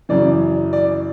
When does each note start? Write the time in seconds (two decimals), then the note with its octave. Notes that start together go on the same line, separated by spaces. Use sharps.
0.09 F#2 C#3 E3 D5
0.73 D5